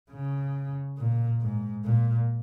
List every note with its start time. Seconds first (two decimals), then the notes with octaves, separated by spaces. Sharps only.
0.11 C#3
0.98 A#2
1.42 G#2
1.84 A#2